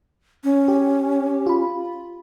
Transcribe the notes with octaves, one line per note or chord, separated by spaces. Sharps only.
C#4
G4
F4 B5